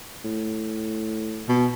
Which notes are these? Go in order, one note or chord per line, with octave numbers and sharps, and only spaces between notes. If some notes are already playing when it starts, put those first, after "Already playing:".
A2
B2